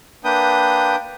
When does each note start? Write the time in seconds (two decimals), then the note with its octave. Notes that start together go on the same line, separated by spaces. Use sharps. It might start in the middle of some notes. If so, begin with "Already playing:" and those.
0.24 A#3 D4 B4 G5 D#6 G6